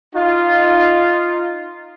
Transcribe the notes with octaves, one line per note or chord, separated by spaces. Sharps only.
D#4 F4